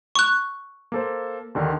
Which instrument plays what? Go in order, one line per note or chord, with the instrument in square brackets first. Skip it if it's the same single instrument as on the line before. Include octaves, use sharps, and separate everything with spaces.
[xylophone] C#6 F#6
[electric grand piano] A#3 A4 C5
D#2 D3 D#3